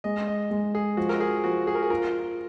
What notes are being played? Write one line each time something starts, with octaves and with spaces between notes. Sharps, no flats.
G#3 D#5
D#5
G#3
G#4
F3 F#4
A#4
G#4
F3 F#4
G#4
A#4
G#4
F4 A#4